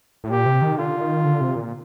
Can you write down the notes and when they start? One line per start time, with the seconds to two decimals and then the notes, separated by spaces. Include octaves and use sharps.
0.24 A2
0.30 A#2 G4
0.46 C3
0.62 D#3
0.77 D3 F4
1.01 D#3
1.25 D3
1.41 C3
1.56 A#2